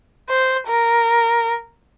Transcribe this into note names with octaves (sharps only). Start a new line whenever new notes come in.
C5
A#4